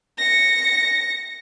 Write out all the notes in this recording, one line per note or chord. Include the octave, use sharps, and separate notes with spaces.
A#6 C#7